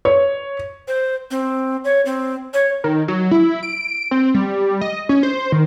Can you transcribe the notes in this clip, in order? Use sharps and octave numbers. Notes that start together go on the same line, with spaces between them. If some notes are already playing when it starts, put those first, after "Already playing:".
C#5
C5
C4
C#5
C4
C#5
D#3
F#3
E4
D7
C4
G3
D#5
C#4
C5
D#3